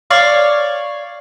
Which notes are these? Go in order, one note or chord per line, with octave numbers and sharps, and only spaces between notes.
C#5 D5 F5